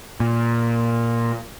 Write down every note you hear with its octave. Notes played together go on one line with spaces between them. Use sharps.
A#2